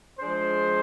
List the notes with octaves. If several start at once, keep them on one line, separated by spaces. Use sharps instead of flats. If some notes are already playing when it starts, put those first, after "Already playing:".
F3 G#3 D4 G#4 C5